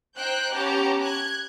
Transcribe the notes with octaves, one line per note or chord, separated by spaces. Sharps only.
D#4 C5 G5 F#6 G6
B3 C#4 G4 A5 A#5
F#6 G#6